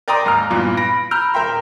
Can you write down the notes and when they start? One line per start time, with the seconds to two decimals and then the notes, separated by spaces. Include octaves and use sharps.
0.08 A#4 D5 G5 A#5 C6 D#6
0.25 D#2 G#2 A#5 F6
0.50 E2 G2 A#2
0.77 B5 A#6 D7
1.11 A#5 B5 E6 F6 G6
1.34 D#1 A#4 E5 G5 C6